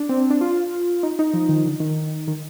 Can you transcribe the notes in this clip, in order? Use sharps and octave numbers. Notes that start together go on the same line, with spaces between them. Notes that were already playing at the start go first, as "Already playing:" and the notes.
Already playing: D4
C4
C4
D4
F4
D#4
D#4
F3
D#3
D3
D#3
D#3